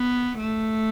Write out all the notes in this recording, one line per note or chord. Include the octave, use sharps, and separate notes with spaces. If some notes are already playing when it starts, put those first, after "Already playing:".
Already playing: B3
A3